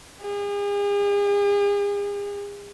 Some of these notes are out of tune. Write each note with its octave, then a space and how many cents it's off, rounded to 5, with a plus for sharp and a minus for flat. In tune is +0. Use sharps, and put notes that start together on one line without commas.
G#4 -40